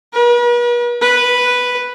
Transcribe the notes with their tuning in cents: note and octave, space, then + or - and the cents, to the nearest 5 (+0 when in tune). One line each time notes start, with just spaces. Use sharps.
B4 -45
B4 +0